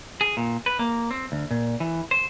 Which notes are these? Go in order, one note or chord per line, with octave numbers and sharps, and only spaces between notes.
G#4
A#2
B4
A#3
C4
D2
A#2
E3
C5